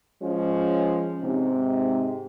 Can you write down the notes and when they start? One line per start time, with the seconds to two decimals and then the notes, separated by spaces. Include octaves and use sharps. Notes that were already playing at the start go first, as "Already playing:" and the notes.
0.22 F3 G#3 C#4
1.21 G#2 C3